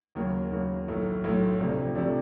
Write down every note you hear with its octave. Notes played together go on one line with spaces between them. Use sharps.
D#2 C#3 F#3 A#3
D#2 C#3 F#3 A#3
B1 A2 F#3 A3
B1 A2 F#3 A3
D2 C3 F3 A3 D4
C3 F3 A3 D4